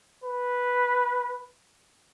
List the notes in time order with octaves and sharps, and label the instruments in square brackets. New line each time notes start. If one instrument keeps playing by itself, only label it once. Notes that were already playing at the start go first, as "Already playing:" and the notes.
[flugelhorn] B4